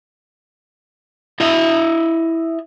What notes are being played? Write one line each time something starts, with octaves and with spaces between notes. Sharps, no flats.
E4 D#5 E5